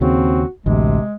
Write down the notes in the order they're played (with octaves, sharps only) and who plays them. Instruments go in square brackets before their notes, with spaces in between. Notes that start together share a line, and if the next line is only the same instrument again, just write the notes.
[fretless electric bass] D#2 C#3 [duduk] C4 [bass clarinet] F#4
[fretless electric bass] A1 D2 [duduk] C3 [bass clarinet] G#3